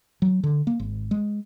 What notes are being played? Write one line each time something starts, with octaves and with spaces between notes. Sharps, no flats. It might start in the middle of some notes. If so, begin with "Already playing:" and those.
F#3
D3
A#3
G#1
G#3